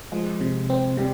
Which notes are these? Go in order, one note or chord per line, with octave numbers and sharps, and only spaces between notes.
F3 G#3
C3
C4
C3 G3